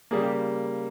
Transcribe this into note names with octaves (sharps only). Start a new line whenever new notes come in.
C#3 G3 A#3 G#4
G4